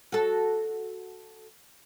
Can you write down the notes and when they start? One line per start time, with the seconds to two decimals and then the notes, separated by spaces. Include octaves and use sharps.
0.12 F#4 A4